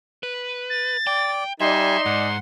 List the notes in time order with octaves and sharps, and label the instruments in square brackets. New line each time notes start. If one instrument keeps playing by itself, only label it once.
[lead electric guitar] B4
[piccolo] A6
[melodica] D5 [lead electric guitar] G5
[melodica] G3 G#5 [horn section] D#4 D5 [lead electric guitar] E5 [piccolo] C6
[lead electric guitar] G#2 [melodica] F#5